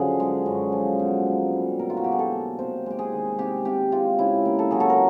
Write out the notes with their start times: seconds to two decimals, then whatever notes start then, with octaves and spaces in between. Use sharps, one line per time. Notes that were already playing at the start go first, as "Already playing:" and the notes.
Already playing: F#2 D3 F3 G#4
0.20 G#3
0.46 F#2
0.72 F3
0.99 B2
1.26 A#3
1.53 G3
1.79 B2 A#4
1.90 F4
1.97 F#4
2.04 B2 G4
2.12 G#4
2.19 A4
2.33 A#3
2.59 C3 C5
2.86 G#3 G4
2.99 G#4
3.12 D#3
3.39 C3 G4
3.65 C3 G4
3.92 G#3 F4
4.19 C#3 E4
4.45 A#3
4.59 A4
4.71 F#3 G#4
4.80 A4
4.90 A#4